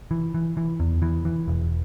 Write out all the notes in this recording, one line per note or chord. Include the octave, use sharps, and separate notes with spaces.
E3
E3
E3
E2
E3
E3
E1